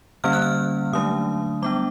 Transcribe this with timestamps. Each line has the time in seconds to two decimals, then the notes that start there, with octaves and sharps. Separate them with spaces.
0.24 D3 G3 A#3 C#4 F6
0.33 F#6
0.42 F6
0.93 D3 F#3 A3 D4 D#6
1.62 G3 B3 D4 D6